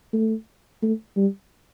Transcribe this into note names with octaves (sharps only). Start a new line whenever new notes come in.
A3
A3
G3